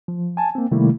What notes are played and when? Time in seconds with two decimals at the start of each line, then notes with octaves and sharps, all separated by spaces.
0.08 F3
0.37 G#5 A5
0.55 A#3 C4
0.72 C3 D#3 G3 A3 A#3 E4